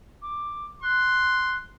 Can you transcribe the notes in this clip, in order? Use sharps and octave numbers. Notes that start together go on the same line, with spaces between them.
D6
C6 F#6